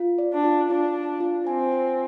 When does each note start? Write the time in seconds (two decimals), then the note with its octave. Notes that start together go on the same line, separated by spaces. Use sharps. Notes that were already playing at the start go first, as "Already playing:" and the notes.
Already playing: F4
0.18 D5
0.32 D4
0.44 F4
0.70 D4 F4
0.96 F4
1.20 F4
1.46 C4 G#5
1.72 F4